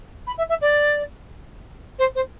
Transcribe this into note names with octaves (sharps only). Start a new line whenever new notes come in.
B5
E5
E5
D5
C5
C5